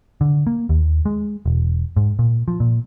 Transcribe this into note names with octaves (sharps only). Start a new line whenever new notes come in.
D3
A#3
D#2
G#3
E1
G#2
A#2
F3
A#2